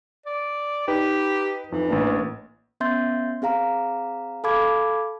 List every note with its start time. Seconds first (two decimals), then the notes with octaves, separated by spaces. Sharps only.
0.26 D5
0.88 D#4 G4 B4
1.72 F2 E3 D#4
1.89 A1 A#3 D4
2.80 B3 C#4 E5 C6 G6 A6
3.42 C4 G#4 F5 A#5
4.44 A4 F5 A5 B5 D6 G#6